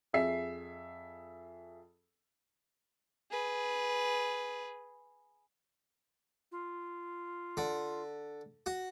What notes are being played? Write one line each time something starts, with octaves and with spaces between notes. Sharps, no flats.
F2 G#4 E5 C7
G#4 B4
F4
D3
F#4